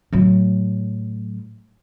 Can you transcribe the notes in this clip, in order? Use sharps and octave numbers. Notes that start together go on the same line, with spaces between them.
A2 F#3